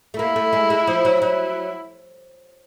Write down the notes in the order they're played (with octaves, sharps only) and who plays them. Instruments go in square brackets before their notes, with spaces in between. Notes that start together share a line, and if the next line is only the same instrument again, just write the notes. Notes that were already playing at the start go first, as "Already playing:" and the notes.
[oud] A3
[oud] A#3 [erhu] E4
[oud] A3
G#3
G#3
F3
F#3
[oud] F#3 [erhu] E4